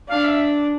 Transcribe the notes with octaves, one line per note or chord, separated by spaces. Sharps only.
D4 F5
E5